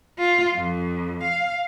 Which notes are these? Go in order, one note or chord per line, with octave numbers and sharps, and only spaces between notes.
F4
F2
F5